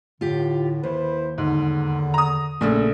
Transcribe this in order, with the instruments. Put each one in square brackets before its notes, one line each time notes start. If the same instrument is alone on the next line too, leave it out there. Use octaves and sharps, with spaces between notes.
[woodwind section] A2 D3 [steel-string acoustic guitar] F4 G4
[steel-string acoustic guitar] D#2 [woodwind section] E4 B4 C5
[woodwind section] E2 D3 [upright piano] G#2
[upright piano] A#5 D#6
[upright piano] A#1 [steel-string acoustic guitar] C#3 A3 A#3